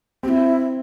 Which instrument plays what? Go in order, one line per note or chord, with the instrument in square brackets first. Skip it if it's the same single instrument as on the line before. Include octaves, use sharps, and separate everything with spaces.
[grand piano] C4 [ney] E4 G4